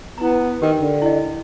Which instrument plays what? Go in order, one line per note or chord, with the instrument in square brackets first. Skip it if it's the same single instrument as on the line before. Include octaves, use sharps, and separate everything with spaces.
[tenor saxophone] B3 [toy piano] E4 A#5
[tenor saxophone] D#3 [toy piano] G4 A#4 G5
[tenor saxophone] D3
[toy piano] E4 D#5